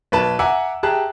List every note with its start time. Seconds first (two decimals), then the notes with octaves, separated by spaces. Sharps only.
0.12 B1 B4 A5
0.39 E5 F#5 G#5 A#5 D6 E6
0.83 G4 G#4 E5 A5 A#5 F#6